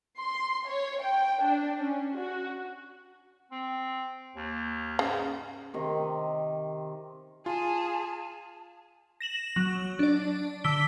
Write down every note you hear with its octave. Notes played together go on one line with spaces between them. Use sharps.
C6
C#5
G5
D4
C#4
F#4
C4
D#2
G#2 C#3
C3 D#3 D#5
F4 G#4 A5
A#6 E7 F#7
F#3
D4 D5
D3 E6 B6 D7 G7